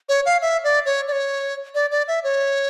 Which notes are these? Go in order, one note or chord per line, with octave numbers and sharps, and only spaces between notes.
C#5
F5
E5
D5
C#5
D5
C#5
D5
D5
E5
C#5